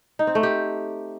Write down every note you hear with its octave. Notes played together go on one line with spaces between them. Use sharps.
D#4
C4
A3
G4